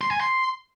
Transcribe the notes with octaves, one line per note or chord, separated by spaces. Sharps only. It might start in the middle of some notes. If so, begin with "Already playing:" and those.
C6
G#5
C6